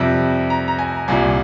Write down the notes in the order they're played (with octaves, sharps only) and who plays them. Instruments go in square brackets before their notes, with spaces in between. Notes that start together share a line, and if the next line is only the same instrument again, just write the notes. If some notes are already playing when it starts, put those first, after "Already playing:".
Already playing: [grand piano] F2 C3 G3
A#5
A#5
G#5
C2 A#2 G3 G#5